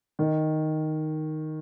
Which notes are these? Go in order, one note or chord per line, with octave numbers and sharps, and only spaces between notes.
D#3